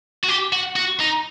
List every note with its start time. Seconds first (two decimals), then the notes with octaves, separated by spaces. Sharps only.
0.24 F#4
0.29 G4
0.53 F#4
0.76 F#4
1.00 D#4